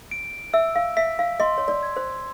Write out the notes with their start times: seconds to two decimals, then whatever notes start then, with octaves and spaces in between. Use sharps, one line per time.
0.11 D7
0.54 E5 E6
0.76 F5
0.97 E5 B6
1.19 F5
1.40 D#5 C6
1.58 C#5
1.68 D5
1.83 G#6
1.97 C5